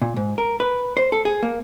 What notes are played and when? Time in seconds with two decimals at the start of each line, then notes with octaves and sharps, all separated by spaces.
0.02 A#2
0.16 G#2
0.38 A#4
0.60 B4
0.97 C5
1.12 A4
1.25 G#4
1.43 A#3